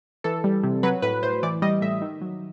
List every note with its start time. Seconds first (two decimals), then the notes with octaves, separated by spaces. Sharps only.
0.24 E3 A4
0.44 G3
0.63 C3
0.83 F#3 B4
1.02 A2 B4
1.23 A2 C5
1.43 E3 D5
1.62 G3 D#5
1.81 A2 E5
2.02 D#3
2.21 F#3